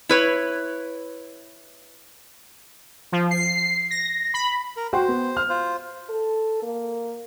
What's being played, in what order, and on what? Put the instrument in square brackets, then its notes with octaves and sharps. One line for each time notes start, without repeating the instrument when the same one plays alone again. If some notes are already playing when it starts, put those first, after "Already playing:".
[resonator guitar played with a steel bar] E4 B4 C#5
[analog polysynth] F3
C7
A#6
B5
[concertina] A#4
[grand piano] F#4 G5 C6 [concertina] C5
[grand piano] B3
F6
[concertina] F4 C5
[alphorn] A4
A#3